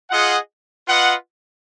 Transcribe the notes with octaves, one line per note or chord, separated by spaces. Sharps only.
F4 G#4 D#5 F#5
F4 B4 D#5 F#5